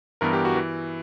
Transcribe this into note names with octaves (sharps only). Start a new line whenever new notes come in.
G2 E3 B3 A#4
G4
F#4
E3